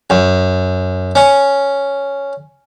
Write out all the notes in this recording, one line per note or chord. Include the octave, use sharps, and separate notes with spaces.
F#2
C#4